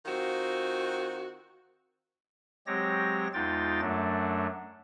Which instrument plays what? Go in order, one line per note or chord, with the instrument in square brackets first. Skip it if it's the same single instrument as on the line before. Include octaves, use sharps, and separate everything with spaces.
[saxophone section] D#3 C4 F4 F#4
[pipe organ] F#3 G#3 C4 G4 C#5 A#6
E2 G#3 D#4 F4 G5 A6
F#2 F#3 A3 D4